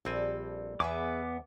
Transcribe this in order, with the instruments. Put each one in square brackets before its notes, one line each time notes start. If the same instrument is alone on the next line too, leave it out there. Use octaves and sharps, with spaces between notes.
[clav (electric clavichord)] A#1 C4 G#5 [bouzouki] G3 A4
[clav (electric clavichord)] E2 [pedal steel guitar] B3 D6 [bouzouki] G#4 B4 E5